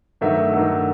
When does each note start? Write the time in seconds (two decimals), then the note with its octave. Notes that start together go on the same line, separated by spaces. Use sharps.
0.21 G2 D#3 F#3 A3 E5
0.52 G2 D#3 F#3 A3